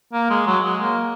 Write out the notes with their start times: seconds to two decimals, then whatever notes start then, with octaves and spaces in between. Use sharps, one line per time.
0.13 A#3
0.30 G#3
0.47 F#3
0.64 G#3
0.82 A#3